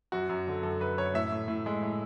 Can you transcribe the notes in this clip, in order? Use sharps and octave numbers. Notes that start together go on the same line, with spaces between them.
F#2 F#4
F#2
D3
F#2 A4
F#2 B4
F#2 C#5
A2 E5
A2
A2
G#3
A2